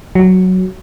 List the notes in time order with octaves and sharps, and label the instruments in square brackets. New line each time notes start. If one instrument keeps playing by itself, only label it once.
[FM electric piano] F#3